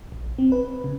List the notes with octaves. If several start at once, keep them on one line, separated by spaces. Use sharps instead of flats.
A#1
C4
B4
C#3